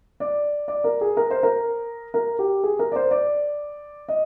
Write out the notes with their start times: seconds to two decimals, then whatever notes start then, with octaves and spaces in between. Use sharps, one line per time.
0.20 D5
0.68 D5
0.84 A#4
1.01 G#4
1.17 A#4
1.31 C5
1.43 A#4
2.14 A#4
2.39 G4
2.63 G#4
2.79 A#4
2.92 D5
2.96 C5
3.11 D5
4.08 D#5